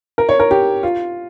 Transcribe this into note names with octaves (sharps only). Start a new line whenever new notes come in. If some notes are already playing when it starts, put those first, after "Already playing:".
A#4
C#5
A#4
G4
F4